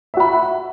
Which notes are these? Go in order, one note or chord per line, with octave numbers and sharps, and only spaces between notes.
F#4 E5 B5